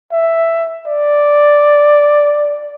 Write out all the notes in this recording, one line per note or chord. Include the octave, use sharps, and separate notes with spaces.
E5
D5